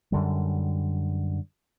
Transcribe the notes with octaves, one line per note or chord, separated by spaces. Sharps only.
F#2 D3 G3